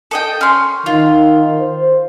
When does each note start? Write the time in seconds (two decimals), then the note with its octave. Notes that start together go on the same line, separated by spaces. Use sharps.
0.11 A4 D#5 G5
0.41 C#4 C6
0.86 D#3 F4
1.59 C5